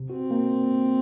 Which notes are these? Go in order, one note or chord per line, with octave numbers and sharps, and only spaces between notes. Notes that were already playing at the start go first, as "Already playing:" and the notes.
Already playing: C3
C4 F#4
A#3